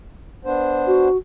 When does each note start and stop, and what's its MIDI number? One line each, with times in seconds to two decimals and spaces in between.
0.45 1.09 59
0.45 1.09 62
0.45 1.09 72
0.86 1.16 66